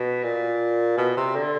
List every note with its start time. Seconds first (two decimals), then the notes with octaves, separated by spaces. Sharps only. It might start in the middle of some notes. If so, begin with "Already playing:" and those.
Already playing: B2
0.23 A#2
0.97 B2
1.17 C3
1.36 D3